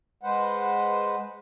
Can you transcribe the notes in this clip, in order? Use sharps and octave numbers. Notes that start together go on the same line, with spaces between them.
G#3 B4 C5 F#5